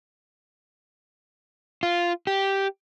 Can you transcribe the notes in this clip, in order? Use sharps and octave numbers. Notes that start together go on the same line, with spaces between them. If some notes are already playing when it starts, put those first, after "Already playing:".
F4
G4